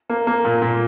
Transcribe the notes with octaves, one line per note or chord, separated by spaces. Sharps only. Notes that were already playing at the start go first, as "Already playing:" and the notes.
A#3
A#3
A#2
A#2